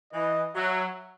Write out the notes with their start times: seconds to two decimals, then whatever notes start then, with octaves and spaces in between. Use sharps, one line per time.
0.13 E3 D#5
0.55 F#3 E5